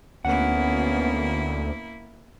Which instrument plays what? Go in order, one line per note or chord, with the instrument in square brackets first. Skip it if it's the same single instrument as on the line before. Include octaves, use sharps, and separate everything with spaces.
[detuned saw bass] D2 [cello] A#3 E4 [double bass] B3 C#4 [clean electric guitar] F#5